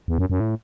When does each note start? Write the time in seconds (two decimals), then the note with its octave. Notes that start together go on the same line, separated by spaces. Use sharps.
0.08 E2
0.18 F#2
0.30 F#2
0.40 A2